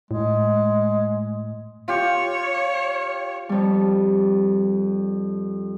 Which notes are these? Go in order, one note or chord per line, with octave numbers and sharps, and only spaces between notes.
A2 G#3
F4 G4 C#5
F2 G3